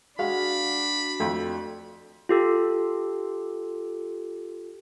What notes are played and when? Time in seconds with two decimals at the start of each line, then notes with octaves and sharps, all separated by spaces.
0.19 G#3 D4 F#4 F5 B5
1.20 F2 A3
2.29 F4 G4 A4